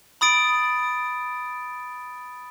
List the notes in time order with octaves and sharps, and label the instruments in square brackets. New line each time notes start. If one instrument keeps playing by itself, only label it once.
[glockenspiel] B5 D#6 A6 D7